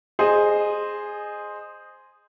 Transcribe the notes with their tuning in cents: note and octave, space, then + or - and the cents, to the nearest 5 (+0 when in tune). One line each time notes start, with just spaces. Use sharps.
G#4 +0 C5 +0 D#5 -20